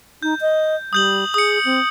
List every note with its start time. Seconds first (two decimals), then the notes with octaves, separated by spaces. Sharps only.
0.23 D#4 G6
0.41 D#5
0.93 G3 D#6 G6 F#7
1.34 G#4 D#6 C#7
1.65 C4